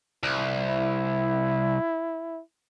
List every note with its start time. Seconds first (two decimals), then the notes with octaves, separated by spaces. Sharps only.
0.23 C2
0.70 E4